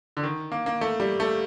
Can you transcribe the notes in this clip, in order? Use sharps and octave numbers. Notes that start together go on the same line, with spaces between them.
D3
D#3
A#3
A#3
A3
G3
A3